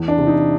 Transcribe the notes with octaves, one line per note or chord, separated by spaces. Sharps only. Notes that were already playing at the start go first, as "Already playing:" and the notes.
Already playing: E2
D4
C3
D#4